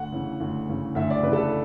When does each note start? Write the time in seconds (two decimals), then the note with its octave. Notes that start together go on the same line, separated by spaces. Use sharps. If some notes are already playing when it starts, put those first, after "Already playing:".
Already playing: D2 F#5
0.12 C#3 E3
0.40 D2
0.68 C#3 E3
0.95 D2 E5
1.10 D5
1.23 C#3 E3 B4
1.33 A4
1.37 B4